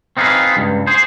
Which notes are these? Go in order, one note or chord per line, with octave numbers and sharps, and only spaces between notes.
C4 D#4 F4 G4 G#4 B4
C#2 G2
G#4 C5